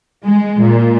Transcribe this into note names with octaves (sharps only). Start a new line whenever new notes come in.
G#3
A#2